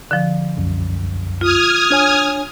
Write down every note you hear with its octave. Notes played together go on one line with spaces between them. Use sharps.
D3 F3
C2 F#2
F4 D#6 F6 G#6
D4 C#5 G#5